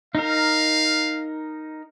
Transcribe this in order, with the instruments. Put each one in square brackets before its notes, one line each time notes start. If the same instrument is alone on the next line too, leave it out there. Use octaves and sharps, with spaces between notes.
[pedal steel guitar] D#4 A#4 [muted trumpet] F5